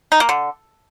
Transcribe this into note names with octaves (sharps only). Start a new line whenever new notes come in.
D#4
A#3
D3